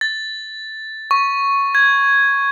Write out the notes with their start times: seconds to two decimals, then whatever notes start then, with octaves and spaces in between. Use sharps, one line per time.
0.01 A6
1.11 C#6
1.75 G#6